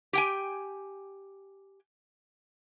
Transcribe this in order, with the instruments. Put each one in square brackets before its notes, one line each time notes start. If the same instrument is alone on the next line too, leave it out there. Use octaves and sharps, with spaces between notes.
[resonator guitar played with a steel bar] G4 G5 G#5